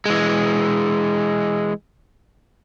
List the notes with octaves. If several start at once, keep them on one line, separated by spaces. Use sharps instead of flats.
E3 G#3